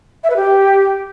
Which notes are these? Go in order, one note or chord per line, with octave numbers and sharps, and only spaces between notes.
E5
B4
G4